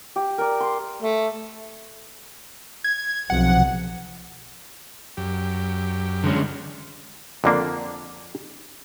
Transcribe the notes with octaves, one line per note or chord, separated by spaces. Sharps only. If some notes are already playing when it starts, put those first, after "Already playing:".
G4
A#4 D5
C6
A3
G#6
B1 C3 F3 F#5
F#2 G4
D3 G#3 C#4
F2 D3 A#3 D4